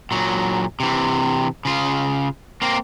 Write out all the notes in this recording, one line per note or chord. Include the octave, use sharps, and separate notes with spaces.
A#2 F#3
C3 E3
C#3 F4
A#3 C4